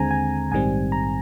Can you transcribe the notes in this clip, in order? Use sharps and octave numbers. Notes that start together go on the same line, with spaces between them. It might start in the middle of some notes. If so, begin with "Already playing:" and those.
Already playing: D#2 D3 G#3 C4 G#5 A#5
G#5
A#1 G#2 D#3 G3 C4 G#5
A#5